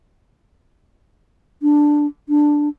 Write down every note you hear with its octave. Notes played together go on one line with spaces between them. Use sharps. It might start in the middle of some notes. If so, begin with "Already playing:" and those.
D4
D4